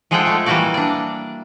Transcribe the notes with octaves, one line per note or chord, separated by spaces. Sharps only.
F3 G#3 G#4 A4 F#5 G5
G#3 A3 F4
E3 G3 A#3 E4 F#4 D5
D4 D5